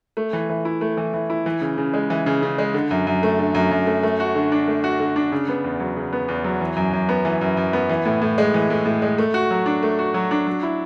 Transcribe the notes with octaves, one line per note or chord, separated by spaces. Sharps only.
A3
E3
E3
E4
A3
E3
E3
E4
E3
C#3
C#3
G#3
E3
C#3
C#3
G#3
D3
F#2
F#2
A3
D3
F#2
F#2
A3
A3
F#4
D3
D4
A3
F#4
D3
D4
C#3
B3
E2
F#3
C#3
B3
E2
F#3
E3
F#2
F#2
B3
E3
F#2
F#2
B3
E3
A2
A2
G#3
E3
A2
A2
G#3
A3
F#4
F#3
D4
A3
F#4
F#3
D4
F#3
E4